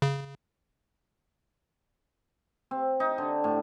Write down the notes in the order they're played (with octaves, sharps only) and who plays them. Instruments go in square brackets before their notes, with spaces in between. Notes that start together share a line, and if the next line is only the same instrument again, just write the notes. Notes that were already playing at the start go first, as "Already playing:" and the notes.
[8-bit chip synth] C#3
[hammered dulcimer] C4
D#4
D3
A2